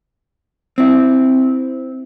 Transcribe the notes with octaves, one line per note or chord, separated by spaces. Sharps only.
C4 E4